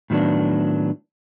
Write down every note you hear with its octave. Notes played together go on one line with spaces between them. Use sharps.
A2 D#3 F#3 B3 D4